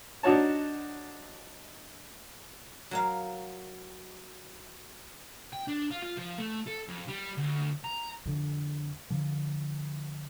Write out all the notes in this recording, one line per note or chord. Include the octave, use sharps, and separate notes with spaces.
D4 D#4 F#4 C#5 A5
F#3 A#4 F5
G5
D4
F4
F4
F3
A3
A4
F2
G3
D2
A#5
F2 D3
D3 F3